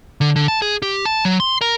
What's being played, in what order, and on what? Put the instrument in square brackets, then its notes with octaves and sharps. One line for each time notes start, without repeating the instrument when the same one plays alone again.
[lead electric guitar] D3
D3
A5
G#4
G4
A5
F#3
C6
A#4